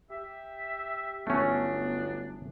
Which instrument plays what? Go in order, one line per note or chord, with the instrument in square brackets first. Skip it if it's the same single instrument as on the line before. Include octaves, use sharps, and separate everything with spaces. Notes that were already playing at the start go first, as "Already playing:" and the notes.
[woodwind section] G4 E5
[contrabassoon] G1 [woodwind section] F#3 B3 D4 [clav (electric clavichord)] A3 C#4